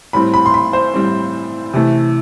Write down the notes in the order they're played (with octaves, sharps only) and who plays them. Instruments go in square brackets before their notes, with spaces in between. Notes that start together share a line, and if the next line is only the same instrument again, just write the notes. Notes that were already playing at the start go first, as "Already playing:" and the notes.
[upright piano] A2 G3 C4 B5
B5
C6
B5
C5
A2 G3 C4
C3 E3 A3